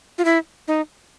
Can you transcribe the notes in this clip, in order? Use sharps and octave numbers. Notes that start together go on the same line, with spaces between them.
F4
E4
D#4